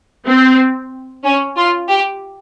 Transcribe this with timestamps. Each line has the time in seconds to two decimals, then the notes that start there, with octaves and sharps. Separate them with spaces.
0.26 C4
1.24 C#4
1.56 F4
1.89 G4